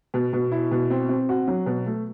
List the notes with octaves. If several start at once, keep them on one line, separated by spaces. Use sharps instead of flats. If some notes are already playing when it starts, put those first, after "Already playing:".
B2
B2
E4
B2
C4
C4
F#4
F#3
B2
A3